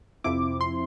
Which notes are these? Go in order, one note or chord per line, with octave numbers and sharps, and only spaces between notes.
F2 C3 F3 C4 E4 D6
C6